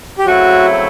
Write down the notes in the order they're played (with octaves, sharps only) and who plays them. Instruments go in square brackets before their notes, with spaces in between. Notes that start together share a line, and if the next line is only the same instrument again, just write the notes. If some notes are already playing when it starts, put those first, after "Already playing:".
[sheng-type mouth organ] G4
[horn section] C#3 F#3 A3 C4 E4 [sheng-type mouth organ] F#4